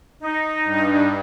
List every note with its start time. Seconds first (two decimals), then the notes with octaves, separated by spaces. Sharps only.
0.20 D#4
0.64 G2